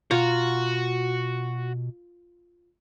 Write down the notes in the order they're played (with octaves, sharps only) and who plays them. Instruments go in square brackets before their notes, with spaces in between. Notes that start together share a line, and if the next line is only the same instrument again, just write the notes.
[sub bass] B2 [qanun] F4 A#5 [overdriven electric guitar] F#4 F#5